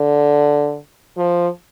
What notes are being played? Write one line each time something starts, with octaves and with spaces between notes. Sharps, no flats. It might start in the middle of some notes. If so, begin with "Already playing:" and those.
Already playing: D3
F3